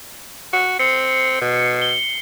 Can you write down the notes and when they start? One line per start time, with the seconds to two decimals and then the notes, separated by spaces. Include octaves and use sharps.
0.53 F#4
0.79 C4 C7 C#7
1.41 B2
1.82 G7